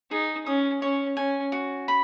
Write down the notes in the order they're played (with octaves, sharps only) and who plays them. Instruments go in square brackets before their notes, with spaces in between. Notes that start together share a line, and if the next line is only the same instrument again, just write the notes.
[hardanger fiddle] D#4 [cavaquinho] G#4
[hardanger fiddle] C#4 [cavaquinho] D#6
[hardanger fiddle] C#4 [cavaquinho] C#5
[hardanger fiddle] C#4 [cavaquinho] G#5
[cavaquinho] F#4
B5